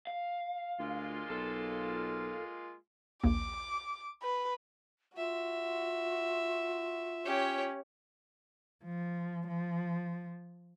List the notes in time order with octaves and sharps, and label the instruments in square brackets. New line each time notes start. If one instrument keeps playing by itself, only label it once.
[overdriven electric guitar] F5
[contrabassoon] D2 [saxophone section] G#3 A#3 F4
[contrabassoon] B1 [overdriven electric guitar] A4
[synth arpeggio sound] A#1 D#2 A#3 [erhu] D6
[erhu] B4
[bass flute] F4 [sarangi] F#4 [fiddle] E5
[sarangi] C#4 [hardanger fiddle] G4 C#5
[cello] F3
F3